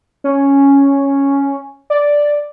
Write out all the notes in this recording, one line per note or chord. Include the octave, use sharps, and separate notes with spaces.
C#4
D5